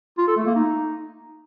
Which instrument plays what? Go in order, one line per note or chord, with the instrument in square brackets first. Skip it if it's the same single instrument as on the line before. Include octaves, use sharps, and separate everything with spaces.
[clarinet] F4
A4
A3
A#3
D#4